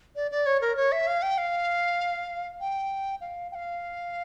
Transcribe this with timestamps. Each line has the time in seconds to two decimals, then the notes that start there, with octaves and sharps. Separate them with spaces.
0.16 D5
0.31 D5
0.46 C#5
0.61 A#4
0.77 C#5
0.92 E5
1.07 F5
1.22 G5
1.38 F5
2.61 G5
3.21 F5
3.52 G5
3.55 F5